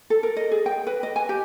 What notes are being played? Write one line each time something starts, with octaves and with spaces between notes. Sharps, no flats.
A4
A#4
D#5
G#4
G5
B4
D#5
G#5
G4